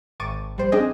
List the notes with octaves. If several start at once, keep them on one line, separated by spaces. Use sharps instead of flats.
G#1 C#6 D6 A6 D#7
A#1 G3 C5
C4 D4 G#4 D#5